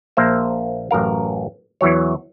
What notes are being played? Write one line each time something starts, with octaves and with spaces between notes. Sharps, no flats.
A#1 A#3 C5 E5
A1 F#2 A#4 F5
E2 E3 F#3 C#5